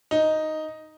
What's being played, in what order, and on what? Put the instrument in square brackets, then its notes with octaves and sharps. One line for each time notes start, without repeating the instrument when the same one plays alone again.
[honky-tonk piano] D#4